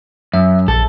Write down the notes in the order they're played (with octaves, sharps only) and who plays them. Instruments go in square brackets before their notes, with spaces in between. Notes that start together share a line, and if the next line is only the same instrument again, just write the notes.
[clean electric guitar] F#2 [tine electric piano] E5
[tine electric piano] A#1 [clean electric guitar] A4